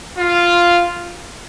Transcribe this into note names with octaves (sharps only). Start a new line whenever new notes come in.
F4